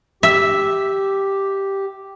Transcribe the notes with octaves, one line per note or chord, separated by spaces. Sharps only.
G4 E5